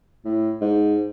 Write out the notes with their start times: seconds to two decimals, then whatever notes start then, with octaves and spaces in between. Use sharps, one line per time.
0.25 A2
0.61 G#2